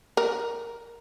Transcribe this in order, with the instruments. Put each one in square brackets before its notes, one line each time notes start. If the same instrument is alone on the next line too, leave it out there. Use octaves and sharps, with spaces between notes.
[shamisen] A#4